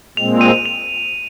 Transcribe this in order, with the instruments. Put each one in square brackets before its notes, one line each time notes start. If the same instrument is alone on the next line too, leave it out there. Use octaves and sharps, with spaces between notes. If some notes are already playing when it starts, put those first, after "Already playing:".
[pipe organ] A#2 G#3 C4 [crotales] F7
[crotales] D#7
F7